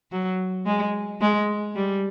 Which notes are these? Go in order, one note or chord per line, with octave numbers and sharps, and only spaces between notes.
F#3
G#3
G#3
G3